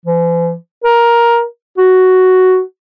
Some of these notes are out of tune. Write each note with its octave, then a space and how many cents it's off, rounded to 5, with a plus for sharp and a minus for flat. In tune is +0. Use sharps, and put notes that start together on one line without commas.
E3 +45
A#4 +10
F#4 +5